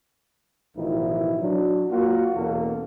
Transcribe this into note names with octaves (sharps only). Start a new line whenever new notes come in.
A1 B2 D#3 F3 D#4 E4
F#3 D4
A#3 F4 F#4
E2 B2 A#3 C#4 F#4 A4